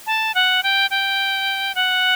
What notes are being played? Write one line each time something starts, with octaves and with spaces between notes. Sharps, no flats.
A5
F#5
G5
G5
F#5